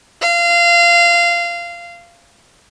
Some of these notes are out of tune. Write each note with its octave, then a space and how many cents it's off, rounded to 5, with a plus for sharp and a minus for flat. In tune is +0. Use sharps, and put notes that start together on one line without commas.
F5 -20